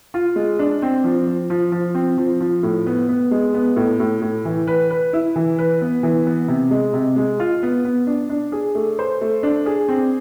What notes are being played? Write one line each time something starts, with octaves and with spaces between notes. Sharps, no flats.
F4
G#3
D4
C4
F3
F3
F3
F3
C4
F3
F3
A2
B3
B3
G#3
B3
A2
A2
A2
E3
B4
B4
E4
E3
B4
B3
E3
B3
C3
G#3
C3
G#3
F4
B3
B3
D4
D4
G#4
A3
C5
A3
D4
G#4
C4